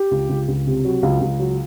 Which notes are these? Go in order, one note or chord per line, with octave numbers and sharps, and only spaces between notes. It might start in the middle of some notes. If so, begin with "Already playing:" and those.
Already playing: G4
C#2
C#2
C#2
C3
F#3
C#2
C#2
F#3